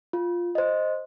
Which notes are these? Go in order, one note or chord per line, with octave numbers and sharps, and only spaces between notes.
F4
C5 D#5